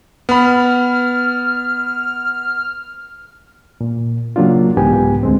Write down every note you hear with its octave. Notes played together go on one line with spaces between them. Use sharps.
B3 B5 F6
A#2
C#3 F#3 A#3 D4 F4
C2 G#2 E3 B3 G4 G#5
D2 G#3 C4